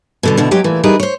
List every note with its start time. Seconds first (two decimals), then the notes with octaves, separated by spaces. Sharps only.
0.23 B2 D3 G3
0.37 B2 D3 E4
0.51 F#3 G#3 G4 C#5
0.64 A#2 E3 A3
0.83 E3 G3 D#4 G#4 A#4 B4
1.00 C5 C#5